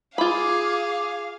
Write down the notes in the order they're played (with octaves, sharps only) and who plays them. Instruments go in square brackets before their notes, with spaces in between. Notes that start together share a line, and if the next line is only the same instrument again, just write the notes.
[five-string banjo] F4 B5 [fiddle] G#4 [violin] F5 [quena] D6